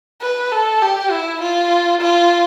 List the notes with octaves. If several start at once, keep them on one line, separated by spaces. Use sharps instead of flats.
B4
A4
G4
E4
F4
F4